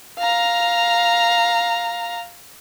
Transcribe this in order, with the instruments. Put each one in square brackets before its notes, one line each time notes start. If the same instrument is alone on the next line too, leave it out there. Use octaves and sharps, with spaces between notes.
[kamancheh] F5 A#5